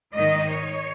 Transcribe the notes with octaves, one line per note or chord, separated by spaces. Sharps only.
G#2 D#3 D#5
C#5